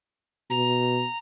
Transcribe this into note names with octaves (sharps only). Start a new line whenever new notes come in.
B2 A#5